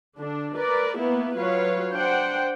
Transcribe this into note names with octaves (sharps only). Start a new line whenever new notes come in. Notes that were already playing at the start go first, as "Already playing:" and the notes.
D3 D4
A#4 B4 D5
A#3 B3 E4
F#3 F4 B4 C#5 F5
D4 C5 F#5 G5